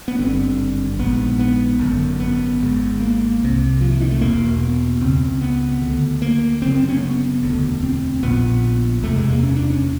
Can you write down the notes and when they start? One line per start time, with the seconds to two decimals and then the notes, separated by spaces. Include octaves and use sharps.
0.08 B3
0.19 G#1 G2 D3 C4
0.99 A#1 G#2 B3
1.39 B3
1.79 G#1 F#2 D3
2.20 B3
2.60 G#1 G#2
3.00 A#3
3.40 C2 C3
3.81 F3
3.91 E3
4.01 D#3
4.11 A3
4.20 E1 E2 B2 A#3
4.61 B3
5.01 C#2 C#3 C4
5.41 B3
5.82 D2 D3
6.22 A#3
6.62 F#1 F#2 C#3 C4
6.75 C4
6.89 C#4
7.02 B3
7.43 E1 D2 D3
7.82 C4
8.23 A#1 A#2 B3
9.03 F#1 E2 C3 A3
9.16 G#3
9.30 A#3
9.43 C#4
9.56 D4
9.70 C#4